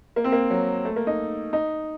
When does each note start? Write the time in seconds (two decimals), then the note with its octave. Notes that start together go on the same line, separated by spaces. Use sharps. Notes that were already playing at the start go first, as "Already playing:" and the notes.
0.16 A#3
0.24 C4
0.32 A#3
0.50 F#3
0.85 A3
0.96 A#3
1.07 D#4
1.53 D#4